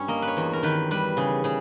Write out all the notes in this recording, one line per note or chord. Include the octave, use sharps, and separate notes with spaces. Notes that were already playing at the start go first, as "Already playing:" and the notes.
Already playing: G2 G3 C#4 C#5
A#3 D#5
B4
C#5
E2
A#4
D#3 B4
G3 B4
C#3 G#4
C#3 G#4